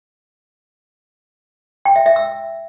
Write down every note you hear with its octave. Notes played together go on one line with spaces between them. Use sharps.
G5
E5
E5
E6